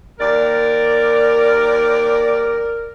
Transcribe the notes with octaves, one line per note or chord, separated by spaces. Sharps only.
D#2 A#4 D5